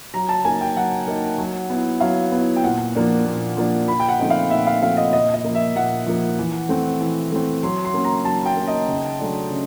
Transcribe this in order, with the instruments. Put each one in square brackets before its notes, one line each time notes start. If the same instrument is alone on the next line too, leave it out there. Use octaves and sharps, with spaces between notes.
[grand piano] F#3 [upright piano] A#5
[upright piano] A5
[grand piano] A#3 D#4 [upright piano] G#5
[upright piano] G5
[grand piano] F#3 [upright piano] F#5
[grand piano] A#3 D#4
F#3
B3 E4
[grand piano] F#3 [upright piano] F5
[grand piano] B3 E4
[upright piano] G5
[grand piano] A#2 [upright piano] F#5
[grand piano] F3 A#3 D4
A#2
F3 A#3 D4
[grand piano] A#2 [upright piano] B5
[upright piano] G5
F#5
[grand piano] F3 A3 C4 D#4
[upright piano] F5
[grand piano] A#2 [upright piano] E5
[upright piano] F5
[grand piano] F3 A3 C4 D#4 [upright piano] F5
[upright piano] D#5
[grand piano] A#2 [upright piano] D#5
[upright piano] D#5
[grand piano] F3 A#3
[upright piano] E5
[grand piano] A#2 [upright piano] F#5
[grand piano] F3 A#3
E3
A3 C4
E3
A3 C4
[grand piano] F#3 [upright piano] C6
[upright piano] C6
[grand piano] A#3 C#4
[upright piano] A#5
[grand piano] F#3 [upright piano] A5
[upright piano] G5
[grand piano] A#3 C#4
[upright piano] D#5
[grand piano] C#3
F#3 A3 D4
C#3